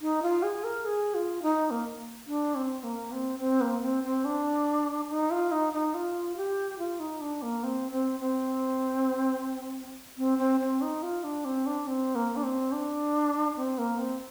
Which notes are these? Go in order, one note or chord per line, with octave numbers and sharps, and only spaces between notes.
D#4
F4
G#4
A#4
G#4
F4
D#4
A#3
D4
C4
A#3
C4
C4
A#3
C4
C4
D4
D#4
F4
D#4
D#4
F4
G4
F4
D#4
D4
A#3
C4
C4
C4
C4
C4
C4
D#4
F4
D4
C4
D4
C4
A#3
D4
C4
D4
C4
A#3
C4